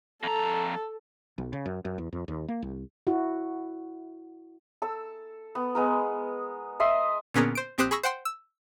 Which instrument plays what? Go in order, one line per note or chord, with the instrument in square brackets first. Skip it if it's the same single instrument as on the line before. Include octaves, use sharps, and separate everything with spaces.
[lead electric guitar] F2 A#5 [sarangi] A4
[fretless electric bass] B1
C#3
F#2
F#2
E2
F2
D#2
A#3
C2
[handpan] E4 F#4
[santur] A4 E6
B3
G#3 B3 A#4
D#5 E5 C6 D#6
[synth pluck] A#2 D3 B3 C#4 G#4 A#4
C5 D7
A#1 C4 G4 C5 D#6 F#6
G#4 B5 C#6 E6 A#6
C5 F#5 G5 C6
E6